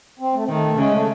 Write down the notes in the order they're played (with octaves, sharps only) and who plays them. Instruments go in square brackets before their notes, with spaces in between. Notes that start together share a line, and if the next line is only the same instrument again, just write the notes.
[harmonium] C4
A3
C4
[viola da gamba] D#3 [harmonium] A3
[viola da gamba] C#3 [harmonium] G#3
[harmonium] A3